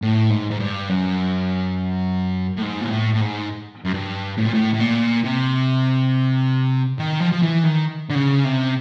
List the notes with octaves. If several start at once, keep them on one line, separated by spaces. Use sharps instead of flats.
A2
G#2
G#2
G2
F#2
A2
G#2
A#2
A2
A2
G#2
F#2
G2
A2
A#2
A2
A2
A#2
C3
D#3
F3
F3
E3
D#3
D3
C#3
C3